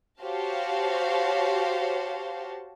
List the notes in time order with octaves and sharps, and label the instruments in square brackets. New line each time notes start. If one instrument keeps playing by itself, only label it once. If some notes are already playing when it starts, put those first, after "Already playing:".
[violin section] F#4 G4 C5 C#5 F5 A5